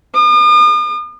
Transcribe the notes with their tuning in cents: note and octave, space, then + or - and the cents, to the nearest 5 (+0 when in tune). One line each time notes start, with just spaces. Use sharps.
D#6 -45